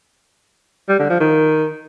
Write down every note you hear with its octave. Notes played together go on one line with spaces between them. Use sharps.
G3
D3
F3
D#3